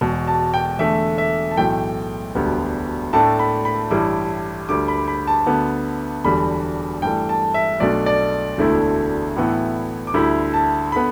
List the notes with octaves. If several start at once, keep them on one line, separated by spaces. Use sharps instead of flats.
E1 E2 B2
A5
G5
E2 D3 A3 E5
E5
A5
B1 A2 E3 A3 G5
E1 D2 D3 G3 B3
A2 A3 D4 A5
B5
B5
A1 G2 G3 E4 D6
D2 D3 G3 D6
B5
B5
A5
D2 D3 B3
E1 E2 D3 G3 B5
G2 E3 A3 G5
A5
E5
B1 B2 A3 D4 D5
D5
E1 D2 D3 A3 E4
A2 E3 B3 E4
D6
D2 D3 G3 E4 B5
A5
D3 B3 B5